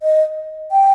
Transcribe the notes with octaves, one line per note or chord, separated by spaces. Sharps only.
D#5
G5